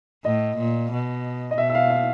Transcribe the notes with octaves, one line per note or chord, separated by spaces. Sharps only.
A2 D#5
A#2
B2
D#5
B2 E5
E5
F5
E5